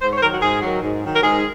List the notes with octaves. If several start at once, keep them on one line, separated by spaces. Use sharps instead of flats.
G#2 C5
C#5
C5
D#3 F#3 A#4
F#4
G#2 G#4
D#3 F#3
G#2
D#3 F#3
A#4
G#2 G#4